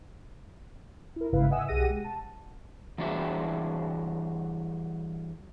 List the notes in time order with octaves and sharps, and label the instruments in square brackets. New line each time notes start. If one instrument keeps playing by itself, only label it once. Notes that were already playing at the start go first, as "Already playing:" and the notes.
[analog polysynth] E4 A#4
G1 G#2 C#3 E4 B4 F5
D#5 E5 F#5 G#5 D#6 E6
B1 G4 G#4 F#5 A#6 D#7
G#3
A5
[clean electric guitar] E3 G3 D4 F#4 G#4 E5